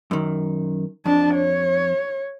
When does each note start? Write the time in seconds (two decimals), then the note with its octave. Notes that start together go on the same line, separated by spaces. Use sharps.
0.11 F#2 D#3
1.06 F2 D4 A5
1.35 C#5